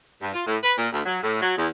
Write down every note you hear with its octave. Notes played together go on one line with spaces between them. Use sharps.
G2
F4
A2
B4
A#2
D2
F#3
A2
F#3
E2